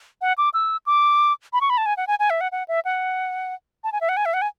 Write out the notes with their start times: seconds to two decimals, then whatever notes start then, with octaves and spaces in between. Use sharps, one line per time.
0.21 F#5
0.38 D6
0.54 E6
0.86 D6
1.53 B5
1.61 C#6
1.70 B5
1.78 A5
1.86 G#5
1.97 F#5
2.07 G#5
2.19 G#5
2.30 E5
2.41 F#5
2.52 F#5
2.68 E5
2.85 F#5
3.84 A5
3.92 G#5
4.01 E5
4.09 F#5
4.17 G#5
4.26 E5
4.34 F#5
4.42 G#5